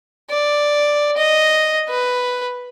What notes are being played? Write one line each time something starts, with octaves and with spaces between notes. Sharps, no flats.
D5
D#5
B4